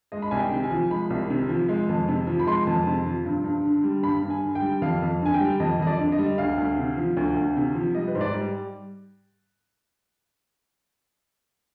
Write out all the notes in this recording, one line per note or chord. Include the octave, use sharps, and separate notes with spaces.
G#3 D#5
B5
C2 G#5
G5
C3
G#5
F3
G#3 B5
C2
C3
F3
G#3
F2
C3
F3
B5
G#3 C6
F2
C3
F3
G2
G2
D3
G3
G2 B5
G2
G#5
D3
G5
G3
F2 F5
F2
D3 G#5
G5
G3
F2 D#5
F2 D#5
D5
D3
D#5
G3
D2 F5
D2
C3
F3
D2
D2
C3
F3
G3 D#5
B4
G#2 C5
D5
G3